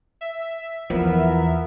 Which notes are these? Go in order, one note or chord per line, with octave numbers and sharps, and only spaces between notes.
E5
E2 F3 B3 E4 A#4